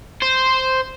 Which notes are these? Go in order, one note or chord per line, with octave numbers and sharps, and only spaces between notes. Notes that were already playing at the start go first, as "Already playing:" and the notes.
C5